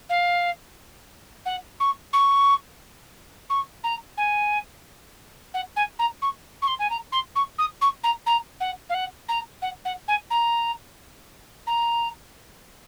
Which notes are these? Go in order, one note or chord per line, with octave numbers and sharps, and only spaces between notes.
F5
F#5
C#6
C#6
C#6
A#5
G#5
F#5
G#5
A#5
C#6
C#6
C6
G#5
A#5
C6
C#6
D#6
C#6
A#5
A#5
F#5
F5
F#5
A#5
F#5
F#5
G#5
A#5
A#5